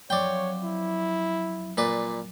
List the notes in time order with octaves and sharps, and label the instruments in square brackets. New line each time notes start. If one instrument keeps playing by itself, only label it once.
[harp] F3 F#3 C4 [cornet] C#5 [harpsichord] D5 G5
[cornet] E4
[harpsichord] A#2 B4 D5